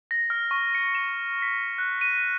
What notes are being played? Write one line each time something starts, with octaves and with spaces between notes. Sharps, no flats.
A#6
F6
C#6
C#7
E7
B6
F#6
D#7